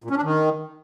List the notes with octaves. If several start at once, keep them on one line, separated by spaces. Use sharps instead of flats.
A#2
C#4
D4
D#3